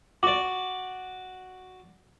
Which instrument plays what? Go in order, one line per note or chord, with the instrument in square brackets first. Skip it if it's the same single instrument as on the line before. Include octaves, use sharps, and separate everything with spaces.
[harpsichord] F#4 D5 [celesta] D6